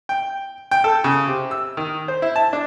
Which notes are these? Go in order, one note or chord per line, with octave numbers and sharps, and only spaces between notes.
G5
G5
A4
C#3
C3
E6
D#3
C5
E4
A5
D4